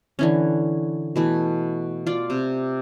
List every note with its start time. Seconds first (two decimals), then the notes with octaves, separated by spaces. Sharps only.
0.19 D3 E3 C#4
1.16 B2 E3 A3
2.07 F4 D5
2.30 C3